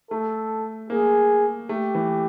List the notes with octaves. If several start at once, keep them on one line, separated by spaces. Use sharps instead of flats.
A3 A4
A#3 G#4
A3 G4
E3